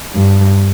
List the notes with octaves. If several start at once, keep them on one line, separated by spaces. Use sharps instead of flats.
G2